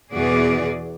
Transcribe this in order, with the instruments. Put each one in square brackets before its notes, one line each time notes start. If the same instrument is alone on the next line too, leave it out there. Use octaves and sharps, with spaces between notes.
[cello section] E2 B2 E3 F#4 G#4 D5